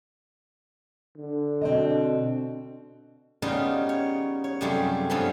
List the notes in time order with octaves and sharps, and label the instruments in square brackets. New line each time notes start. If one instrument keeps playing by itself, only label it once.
[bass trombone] D3
[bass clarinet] B2 [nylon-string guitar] C4 D4 D#5
[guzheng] C#3 G3 B3 D#4 F4
C#5
C#5
F#2 C3 F3 G3 A3 G#4
G2 F3 B3 C#4 A4 B5